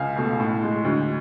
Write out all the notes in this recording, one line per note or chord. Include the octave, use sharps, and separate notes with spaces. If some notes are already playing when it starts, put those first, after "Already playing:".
Already playing: C#2 F5 G#5
B2 A3
A2
G#3
D2